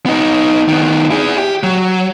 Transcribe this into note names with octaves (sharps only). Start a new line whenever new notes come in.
B3 D#4
D#3 B3
E4 G#4
G4
F#3